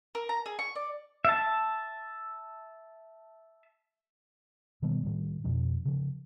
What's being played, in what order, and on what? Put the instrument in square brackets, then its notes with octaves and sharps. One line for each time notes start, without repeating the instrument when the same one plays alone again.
[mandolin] A#4
A#5
G#4
C#6
D5
[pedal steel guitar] E5 A5
[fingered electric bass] B2 D#3 G3 B3
A2 D#3 G3
F2 B2 F3 D4
C#3 F3